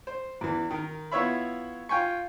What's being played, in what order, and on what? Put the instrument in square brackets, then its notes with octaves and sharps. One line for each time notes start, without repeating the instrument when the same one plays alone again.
[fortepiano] C5
E2 E3
D#3 A#4
B3 E4 F4 C#5 E5 B5
F4 G5 G#5 C#6